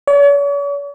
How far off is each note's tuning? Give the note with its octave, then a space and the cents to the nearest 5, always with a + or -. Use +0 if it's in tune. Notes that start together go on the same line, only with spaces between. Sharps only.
C#5 +45